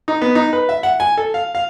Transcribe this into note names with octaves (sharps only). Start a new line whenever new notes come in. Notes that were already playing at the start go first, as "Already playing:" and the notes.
D#4
B3
D#4
B4
E5
F#5
G#5
A4
F5
F5